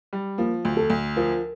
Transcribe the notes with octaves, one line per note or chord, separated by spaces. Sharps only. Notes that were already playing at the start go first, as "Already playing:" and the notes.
G3
F3 A#3
D2
A4
D2
F3 A#4